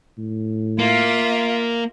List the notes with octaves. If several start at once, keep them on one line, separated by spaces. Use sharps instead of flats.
A2
A#3 F4 E5